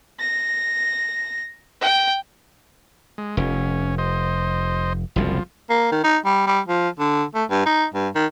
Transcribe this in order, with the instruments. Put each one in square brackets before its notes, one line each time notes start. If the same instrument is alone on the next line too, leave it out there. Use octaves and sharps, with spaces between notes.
[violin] A#6
G5
[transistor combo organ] G#3
[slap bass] F1 [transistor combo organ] C#4
[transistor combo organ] C5 D#5
[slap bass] F#1 C2 F#2 [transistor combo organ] F3
[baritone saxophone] A#3
D#3
D#4
G3
G3
F3
D3
A3
G2
D#4
G2
D#3